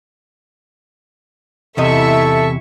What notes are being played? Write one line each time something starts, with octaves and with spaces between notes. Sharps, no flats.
E2 C3 E4 A4 D#5 E5 C#6